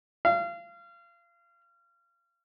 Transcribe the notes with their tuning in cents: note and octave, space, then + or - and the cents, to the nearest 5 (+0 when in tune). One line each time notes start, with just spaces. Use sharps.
F5 -30